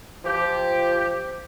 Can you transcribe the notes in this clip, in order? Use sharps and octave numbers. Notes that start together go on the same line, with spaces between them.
F3 G4